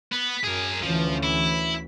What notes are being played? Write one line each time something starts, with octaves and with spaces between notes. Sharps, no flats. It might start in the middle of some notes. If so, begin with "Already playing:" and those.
B3
F#2 G#4 A#4
D2 E3 F3 C#4
E4